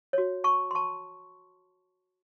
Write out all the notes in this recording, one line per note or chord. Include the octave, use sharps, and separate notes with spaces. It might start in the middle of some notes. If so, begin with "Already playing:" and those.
F#4 C#5
A5 C#6
C6
A5 C#6